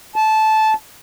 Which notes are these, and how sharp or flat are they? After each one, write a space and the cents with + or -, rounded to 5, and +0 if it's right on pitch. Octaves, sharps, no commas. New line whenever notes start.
A5 -15